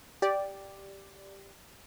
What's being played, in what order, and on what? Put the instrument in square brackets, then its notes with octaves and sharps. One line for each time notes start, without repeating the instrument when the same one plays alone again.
[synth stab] G4 D5